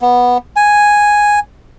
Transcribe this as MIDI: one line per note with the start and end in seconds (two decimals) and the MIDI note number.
0.01 0.38 59
0.56 1.39 80